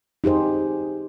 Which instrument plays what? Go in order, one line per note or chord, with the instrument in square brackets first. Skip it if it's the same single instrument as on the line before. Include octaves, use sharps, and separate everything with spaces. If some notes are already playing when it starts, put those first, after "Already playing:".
[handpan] D#4 G4 G#4 C5